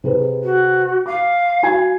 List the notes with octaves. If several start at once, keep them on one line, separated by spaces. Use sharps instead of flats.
C3 G#4 B4
F#4
F5 D6
F#4 G#5 G#6